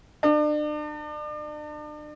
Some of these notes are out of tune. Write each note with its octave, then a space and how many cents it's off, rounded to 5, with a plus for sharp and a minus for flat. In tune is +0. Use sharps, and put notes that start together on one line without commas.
D4 +40